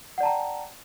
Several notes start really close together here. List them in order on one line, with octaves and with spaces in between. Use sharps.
F#5 D5 A5 A#5 G5